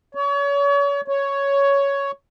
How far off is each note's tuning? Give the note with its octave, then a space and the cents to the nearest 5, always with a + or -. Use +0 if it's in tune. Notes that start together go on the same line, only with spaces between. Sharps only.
C#5 +35
C#5 +5